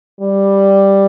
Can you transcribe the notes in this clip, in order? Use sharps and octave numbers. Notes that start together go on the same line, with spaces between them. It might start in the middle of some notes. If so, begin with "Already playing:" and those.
G3